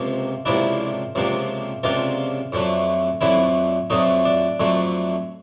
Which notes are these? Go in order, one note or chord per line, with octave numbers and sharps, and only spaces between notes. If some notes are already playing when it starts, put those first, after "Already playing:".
Already playing: C#2 C3 F3 A#3
C#2 C3 F3 A#3 D4 E4
C#2 C3 F3 A#3 D4
C#2 C3 F3 A#3 D4 F4
F2 D3 F#3 A3
F2 D3 F#3 A3 E4
F2 D3 F#3 A3 D#4
D4
F2 D3 F#3 A3